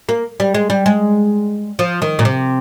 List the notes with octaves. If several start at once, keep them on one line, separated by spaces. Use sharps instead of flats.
A#3
G3
G#3
G3
G#3
F3
D#3
A#2
C3